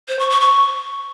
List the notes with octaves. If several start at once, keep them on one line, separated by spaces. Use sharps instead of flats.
C5
C#6
C#6
C#6